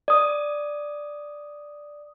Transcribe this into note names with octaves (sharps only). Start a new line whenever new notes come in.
D5 D#6